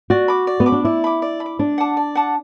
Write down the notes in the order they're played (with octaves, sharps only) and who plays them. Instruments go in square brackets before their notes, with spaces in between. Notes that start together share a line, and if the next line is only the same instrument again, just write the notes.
[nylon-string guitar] F#4 [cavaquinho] D5
[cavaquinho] B5 D6
D5
[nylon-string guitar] B3
[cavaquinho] B5 D6
[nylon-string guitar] D4
[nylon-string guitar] E4 [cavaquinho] D5
[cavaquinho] B5 D6
D5
B5
D6
[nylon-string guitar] D4 [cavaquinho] D5
[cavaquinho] F#5 A5 D6
D5
F#5 A5 D6